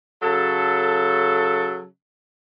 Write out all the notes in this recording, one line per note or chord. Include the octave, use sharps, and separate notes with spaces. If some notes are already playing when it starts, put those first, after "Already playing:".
C#3 F#3 A4